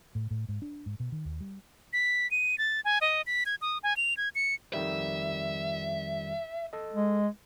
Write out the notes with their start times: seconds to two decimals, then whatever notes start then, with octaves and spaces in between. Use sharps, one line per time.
0.15 A2
0.31 A2
0.49 G#2
0.62 D4
0.86 G#2
1.00 B2
1.12 D#3
1.25 D#2
1.41 G3
1.93 B6
2.31 D#7
2.58 A6
2.85 G#5
3.01 D#5
3.26 B6
3.46 G#6
3.62 D#6
3.83 G#5
3.97 F7
4.17 G#6
4.35 C#7
4.74 F2 D#3 G3 E5
6.73 A4 D#5
6.94 G#3